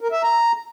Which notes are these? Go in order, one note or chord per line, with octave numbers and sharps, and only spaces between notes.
A#4
E5
A#5